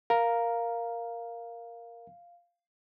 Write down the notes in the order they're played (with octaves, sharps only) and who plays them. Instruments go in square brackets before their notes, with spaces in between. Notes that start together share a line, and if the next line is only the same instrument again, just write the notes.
[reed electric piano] A#4 A#5 [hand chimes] F5